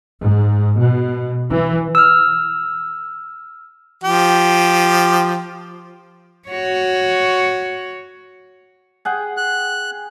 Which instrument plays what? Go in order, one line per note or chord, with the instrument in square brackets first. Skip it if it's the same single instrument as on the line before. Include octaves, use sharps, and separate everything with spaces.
[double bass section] G#2
B2
E3
[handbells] E6 F6
[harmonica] F3 G4
[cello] F#4 C#5
[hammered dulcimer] G#4 F#5 G5
[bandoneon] F#6